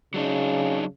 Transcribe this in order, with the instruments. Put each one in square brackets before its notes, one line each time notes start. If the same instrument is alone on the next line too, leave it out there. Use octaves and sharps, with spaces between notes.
[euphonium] C#3 [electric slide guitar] F#3 D4 D#4